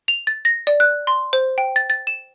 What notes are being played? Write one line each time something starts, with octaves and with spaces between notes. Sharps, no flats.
F7
A6
A#6
D5
F#6
C6
C5
G5
A6
A6
E7